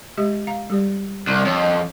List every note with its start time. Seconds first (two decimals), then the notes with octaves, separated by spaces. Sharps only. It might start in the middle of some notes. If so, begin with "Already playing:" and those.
0.17 G#3 G4 D#5
0.47 F5 A#5
0.70 G3 G4 D5
1.27 C2
1.45 F2 C#5